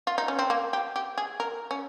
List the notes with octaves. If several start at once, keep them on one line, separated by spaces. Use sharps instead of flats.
F4
D#4
C#4
C4
A#3
G4
G4
G#4
A#4
C#4